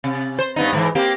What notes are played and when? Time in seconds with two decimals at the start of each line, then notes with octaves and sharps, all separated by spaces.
0.04 C3
0.39 C5
0.56 G2 B3 D#4
0.73 G#2 D#3 E3
0.95 A#3 C4 G4